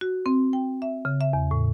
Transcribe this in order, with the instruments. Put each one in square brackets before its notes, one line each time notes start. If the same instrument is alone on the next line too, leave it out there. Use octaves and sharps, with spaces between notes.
[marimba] F#4
C4
G5
E5
C#3
E5
E2
A2